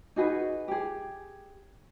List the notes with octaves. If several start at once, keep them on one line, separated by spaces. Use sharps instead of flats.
D#4 F#4 G#4 B4
G4 G#4